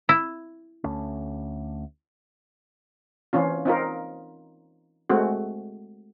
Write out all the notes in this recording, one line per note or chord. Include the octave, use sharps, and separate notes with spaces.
E4
D2 A3 C#4
E3 C4 C#4 F4
C4 D#4 F4 A#4
G#3 A3 C4 F#4